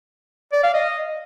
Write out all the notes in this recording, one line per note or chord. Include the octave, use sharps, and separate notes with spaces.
D5
F5
D#5